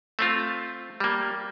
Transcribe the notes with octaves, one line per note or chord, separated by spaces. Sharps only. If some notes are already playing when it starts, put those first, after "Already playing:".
A3 C4 F4
G3 A#3